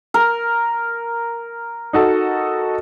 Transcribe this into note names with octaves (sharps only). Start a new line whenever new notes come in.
A#4
D#4 F#4 A4